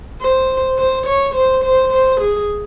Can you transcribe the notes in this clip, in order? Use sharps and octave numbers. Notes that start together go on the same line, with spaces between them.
C5
C5
C#5
C5
C5
C5
G#4